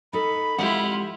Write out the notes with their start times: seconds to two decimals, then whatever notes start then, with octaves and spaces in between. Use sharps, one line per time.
0.13 D#4 A4 B5
0.58 F2 G#2 E4 F4 G4 F#5